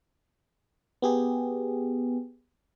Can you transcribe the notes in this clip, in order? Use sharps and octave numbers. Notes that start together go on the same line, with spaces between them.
B3 G4 G#4